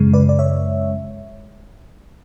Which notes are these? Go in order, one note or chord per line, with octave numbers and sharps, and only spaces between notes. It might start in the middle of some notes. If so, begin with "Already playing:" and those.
Already playing: F#2 C#3 G#3
B4 D5
D5
C#5 E5